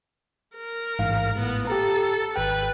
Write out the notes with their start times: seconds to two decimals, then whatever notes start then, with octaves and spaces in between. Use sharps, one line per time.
0.57 A#4
0.99 A1 G#2 F5
1.38 A2 B3
1.67 G4 A4 A#5
2.36 G#1 B4 G5